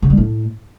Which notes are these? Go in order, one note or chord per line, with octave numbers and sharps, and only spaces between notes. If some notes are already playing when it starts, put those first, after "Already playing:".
C#3
G3
A2